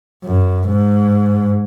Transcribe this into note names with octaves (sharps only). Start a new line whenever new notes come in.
F#2
G#2